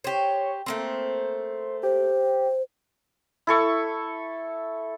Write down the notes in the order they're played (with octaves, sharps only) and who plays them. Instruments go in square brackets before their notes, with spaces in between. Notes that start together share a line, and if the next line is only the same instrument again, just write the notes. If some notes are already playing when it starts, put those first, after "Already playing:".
[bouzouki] G4 C5 [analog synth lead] C#5
[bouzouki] A3 A#3 C4 [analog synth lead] C5
[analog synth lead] G4 [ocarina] C5
[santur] E4 A4 C#6